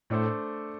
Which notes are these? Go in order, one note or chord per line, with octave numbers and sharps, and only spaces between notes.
A2 A3 D4 A4 C5